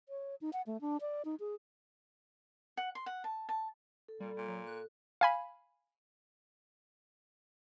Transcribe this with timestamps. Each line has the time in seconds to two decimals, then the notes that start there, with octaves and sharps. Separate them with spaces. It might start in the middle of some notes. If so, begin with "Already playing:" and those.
0.09 C#5
0.41 D#4
0.53 F#5
0.67 A3
0.81 D4
1.01 D5
1.25 D#4
1.40 G#4
2.77 F#5
2.95 C6
3.06 F#5
3.24 A5
3.49 A5
4.08 A4
4.20 A#2 G3
4.37 A#2
4.48 F#3
4.67 F#6
5.21 F5 G#5 B5